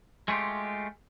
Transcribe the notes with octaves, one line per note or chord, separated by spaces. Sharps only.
G#3 A3 C#4 F4 G4